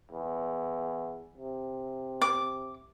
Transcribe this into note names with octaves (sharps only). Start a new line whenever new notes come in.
E2
C3
D6